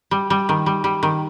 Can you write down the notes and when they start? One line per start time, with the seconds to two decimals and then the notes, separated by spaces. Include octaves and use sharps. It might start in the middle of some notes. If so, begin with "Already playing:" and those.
0.11 G3
0.30 G3
0.49 D#3
0.66 G3
0.84 G3
1.03 D#3